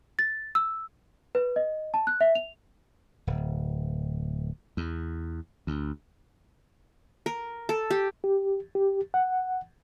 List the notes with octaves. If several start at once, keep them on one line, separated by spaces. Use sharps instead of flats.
A6
E6
B4
D#5
A5
F#6
E5
F7
D1
E2
D2
A#4
A4
G4
G4
G4
F#5